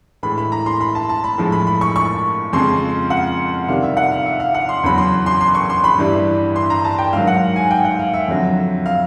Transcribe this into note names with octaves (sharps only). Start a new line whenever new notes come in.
A2 E3 G#3 B5
B5
A#5
C6
B5
A5
A5
B5
A2 F3 G#3
B5
B5
C#6
C#6
F2 C#3 F3 G#3 C6
F#5
C3 D#3 G3 F5
E5
F#5
F5
E5
F5
F#5
C6
E2 C#3 F#3 B5
C6
C6
C6
C#6
C6
B5
G2 E3 G3
C6
A#5
A5
G5
G#2 D#3 F#3 F5
F#5
G#5
G5
F#5
F5
E5
F2 D3 F#3
F5